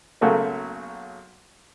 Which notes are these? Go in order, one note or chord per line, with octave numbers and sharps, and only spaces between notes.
B1 C#3 F#3 A3 A#3